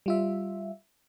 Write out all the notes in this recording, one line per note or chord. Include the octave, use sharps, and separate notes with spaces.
G3 F4 E5